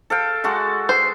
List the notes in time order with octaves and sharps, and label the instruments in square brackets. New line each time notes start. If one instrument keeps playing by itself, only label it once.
[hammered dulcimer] A4 F5 G5
G#3 F#4 A4
[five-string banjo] C5